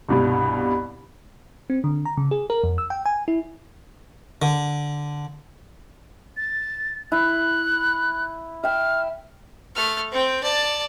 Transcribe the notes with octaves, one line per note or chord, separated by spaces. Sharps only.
C2 G2 B2
C4
D3
A#5
C#3
G#4
A#4
F2
E6
G5
G#5
E4
D3
A6
E4 F#6
E5 G5 F6
A3 F6
C4 G5
D5 A5